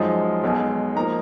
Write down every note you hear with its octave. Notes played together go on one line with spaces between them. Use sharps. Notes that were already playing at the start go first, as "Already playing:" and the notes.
Already playing: F#2 F3 G#3 D#4
B1 B2 G#3
F3 A#3 D#4 A#5